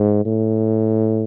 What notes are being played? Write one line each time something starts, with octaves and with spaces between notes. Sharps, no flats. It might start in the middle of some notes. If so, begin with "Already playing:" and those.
Already playing: G#2
A2